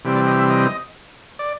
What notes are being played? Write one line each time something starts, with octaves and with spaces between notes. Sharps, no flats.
C3 E3 G3 C4
D5
D#5
E5
D#5
D5